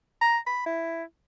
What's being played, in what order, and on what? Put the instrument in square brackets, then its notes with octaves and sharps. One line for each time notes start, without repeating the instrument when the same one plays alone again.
[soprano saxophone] A#5
B5
E4